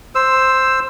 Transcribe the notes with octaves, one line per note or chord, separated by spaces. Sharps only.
C5 E6